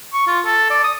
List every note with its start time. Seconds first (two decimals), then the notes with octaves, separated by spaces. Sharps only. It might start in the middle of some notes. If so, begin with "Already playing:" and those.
0.13 C#6
0.27 F4
0.45 A4
0.70 D5
0.84 D#6